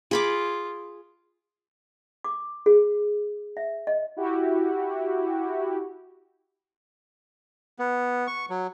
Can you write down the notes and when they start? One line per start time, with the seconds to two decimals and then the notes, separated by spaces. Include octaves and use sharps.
0.11 F4 G#4 B5 D6
2.24 D6
2.66 G#4
3.57 E5
3.87 D#5
4.17 E4 F#4 G4
7.79 B3
8.27 C#6
8.50 F#3